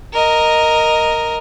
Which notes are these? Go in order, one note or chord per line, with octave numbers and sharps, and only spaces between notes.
A#4 D#5